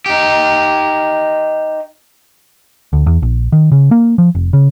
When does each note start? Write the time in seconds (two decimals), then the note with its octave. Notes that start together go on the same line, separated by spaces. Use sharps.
0.06 D#4 G4
2.93 D2
3.06 E2
3.22 A#1
3.52 D#3
3.72 C#3
3.91 A#3
4.18 F3
4.35 F1
4.53 C#3